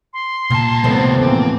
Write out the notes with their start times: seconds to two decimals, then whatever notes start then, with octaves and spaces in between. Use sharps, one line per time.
0.13 C6
0.50 C2 A#2 A5
0.84 D#2 F3 G3 A3 B3 C4
1.22 A2 E3 A#3 C4 D6